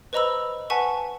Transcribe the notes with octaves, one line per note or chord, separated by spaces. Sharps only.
B4 C5 D#5 A#5 B5 E6
B4 F#5 G#5 A5 C#6 B6